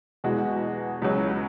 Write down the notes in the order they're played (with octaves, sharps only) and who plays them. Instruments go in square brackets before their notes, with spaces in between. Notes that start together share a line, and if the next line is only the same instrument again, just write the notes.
[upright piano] E2 B2 G#3 F#4
C#2 C#3 F#3